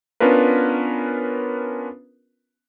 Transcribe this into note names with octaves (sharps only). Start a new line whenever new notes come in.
B3 C#4 D4 F4 A#4 B4